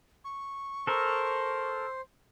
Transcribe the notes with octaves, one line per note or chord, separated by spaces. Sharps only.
C#6
A4 A#4 C5